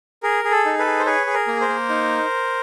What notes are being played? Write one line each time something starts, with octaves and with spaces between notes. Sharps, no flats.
G#4 A#4
G#4
A4
D#4
A4 B4
G#4
C5
G#4 B4 C#5
G#4
A#4
A#3
A#4 C5
A#3
D#4